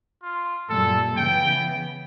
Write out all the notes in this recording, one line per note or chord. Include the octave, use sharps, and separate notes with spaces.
F4
F#2 A#2 G3 A4
C#3 E3 B3 G5